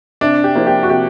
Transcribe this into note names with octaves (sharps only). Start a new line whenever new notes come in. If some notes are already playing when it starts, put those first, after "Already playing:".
C3 D4
G4
F3 A#3
G4
F#4
C3 G4